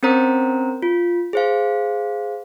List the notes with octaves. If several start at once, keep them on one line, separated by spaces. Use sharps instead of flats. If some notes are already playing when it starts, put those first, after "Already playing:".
C4 C#4 A#4 C5 A#5
F4
G#4 C5 F5